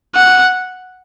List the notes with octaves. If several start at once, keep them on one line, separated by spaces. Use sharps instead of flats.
F#5